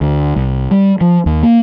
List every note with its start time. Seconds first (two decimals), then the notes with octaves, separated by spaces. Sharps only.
0.01 D2
0.36 C2
0.71 G3
1.01 F3
1.26 D#2
1.43 A#3